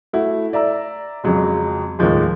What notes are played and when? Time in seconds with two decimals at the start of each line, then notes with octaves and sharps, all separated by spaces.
0.13 A3 E4 F#4
0.53 D5 E5 A#5 E6
1.24 F2 C#3 F3 F#3 G#3
1.99 D#2 A2 C#3 F3 G#3